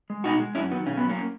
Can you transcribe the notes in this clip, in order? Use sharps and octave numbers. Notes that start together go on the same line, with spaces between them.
G#3
B2 D#4 F#4
G#3
F#2 C#4 E4
D#3 F#3 B3
B2 C#4
F#3 B3
A#3 C#4